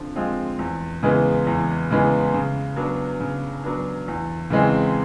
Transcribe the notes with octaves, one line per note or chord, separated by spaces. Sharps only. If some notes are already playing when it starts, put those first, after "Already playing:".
Already playing: D3 F3 C4
F3 G#3 C4 F4
E2
C#3 E3 G#3 B3
E2
C#3 E3 G#3 B3
C#3
F#3 B3 D4
C#3
F#3 B3 D4
E2
C#3 E3 G#3 C4